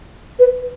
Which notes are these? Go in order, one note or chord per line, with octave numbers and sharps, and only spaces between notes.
B4